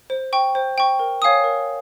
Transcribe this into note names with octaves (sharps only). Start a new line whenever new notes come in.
C5
G5 C#6
C5
G5 C#6
A#4
C#5 F5 G#5 D#6
A#4